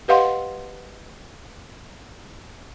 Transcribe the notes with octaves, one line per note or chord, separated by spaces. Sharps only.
G4 B4 D#5 F5 F#5 C6